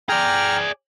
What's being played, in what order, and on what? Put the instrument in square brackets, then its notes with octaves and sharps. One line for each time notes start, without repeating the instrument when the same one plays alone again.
[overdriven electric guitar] G#4 D5 [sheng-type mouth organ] G5 A#5 F6